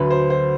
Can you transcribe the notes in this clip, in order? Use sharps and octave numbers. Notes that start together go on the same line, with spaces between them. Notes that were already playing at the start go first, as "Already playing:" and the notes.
Already playing: D2 D3 F#3 B4
C5
C5